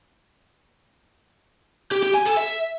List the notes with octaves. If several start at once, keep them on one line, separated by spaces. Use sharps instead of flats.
G4
G4
G#5
A4
E5